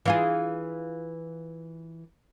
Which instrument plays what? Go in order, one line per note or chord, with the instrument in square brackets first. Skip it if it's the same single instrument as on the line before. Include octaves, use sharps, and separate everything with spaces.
[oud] E3 F4 G#4